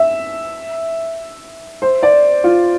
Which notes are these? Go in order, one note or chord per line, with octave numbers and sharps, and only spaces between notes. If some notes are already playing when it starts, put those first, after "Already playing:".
Already playing: E5
C5
D5
F4